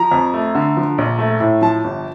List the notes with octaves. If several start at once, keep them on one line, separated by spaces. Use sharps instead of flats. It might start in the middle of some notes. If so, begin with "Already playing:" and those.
Already playing: F3 A#5
F2
A3
D3
F3
A#1
A3
A2
F3 A5
G1